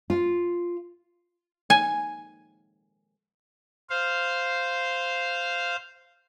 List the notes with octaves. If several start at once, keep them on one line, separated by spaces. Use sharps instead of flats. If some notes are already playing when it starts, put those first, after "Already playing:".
F4
G#5
C5 F5